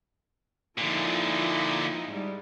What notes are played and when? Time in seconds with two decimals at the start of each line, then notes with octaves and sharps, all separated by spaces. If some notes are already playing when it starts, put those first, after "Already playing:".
0.78 A#2 D3 F3 D#4 E4
2.08 G#2 G3